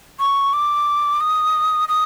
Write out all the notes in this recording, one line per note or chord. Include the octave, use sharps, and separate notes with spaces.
C#6
D6
D#6
D#6